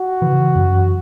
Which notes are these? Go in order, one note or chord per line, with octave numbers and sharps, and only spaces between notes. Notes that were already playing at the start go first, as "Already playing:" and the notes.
Already playing: F#4
C#3 E3
F#2